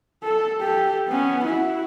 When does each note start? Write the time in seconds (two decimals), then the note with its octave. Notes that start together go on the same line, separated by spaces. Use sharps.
0.23 A4
0.61 G4 A4
1.08 B3 C#4
1.45 E4 F#4